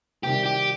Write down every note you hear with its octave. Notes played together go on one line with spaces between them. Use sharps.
C3 D#3 G3 G4
G4